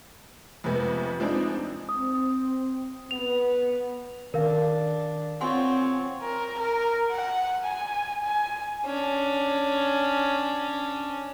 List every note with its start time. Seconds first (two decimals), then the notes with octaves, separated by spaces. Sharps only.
0.64 F2 C3 G#3 B3
1.20 F3 G#3 C4 D4 D#4
1.89 C4 D#6
3.11 B3 F7
4.34 D#3 D4 A#4 F5
5.41 C4 F4 C#5 F#5 G#5 C6
6.23 A#4
6.58 A#4
7.11 F#5
7.64 G#5
8.24 G#5
8.86 C#4 D4